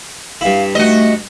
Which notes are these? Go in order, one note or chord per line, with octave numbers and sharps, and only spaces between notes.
G2 E4 F5
A3 F#4 D#5